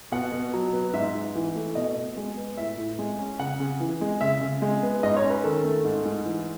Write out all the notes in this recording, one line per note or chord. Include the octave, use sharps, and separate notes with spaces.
B2 F#5
B2
F#3
B3
G#2 E5
G#2
E3
A3
B2 D#5
B2
G#3
B3
A2 E5
A2
G#3
C#4
C#3 F#5
C#3
E3
G#3
C#3 E5
C#3
G#3
B3
G#2 D#5
C#5
C#4
B4
D#3 A4
A3
G#2
G#2
E3